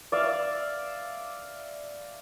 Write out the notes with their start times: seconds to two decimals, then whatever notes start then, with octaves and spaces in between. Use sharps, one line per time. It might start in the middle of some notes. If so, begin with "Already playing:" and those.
0.12 D5 E5 F5